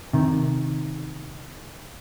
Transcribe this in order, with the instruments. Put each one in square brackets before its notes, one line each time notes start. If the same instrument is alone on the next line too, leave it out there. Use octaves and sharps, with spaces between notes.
[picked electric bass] C3 D#3